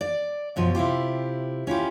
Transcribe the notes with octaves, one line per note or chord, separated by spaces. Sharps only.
D5
F#2 B2 F3
C3 E4 F4 G4
C#4 E4 F4 G4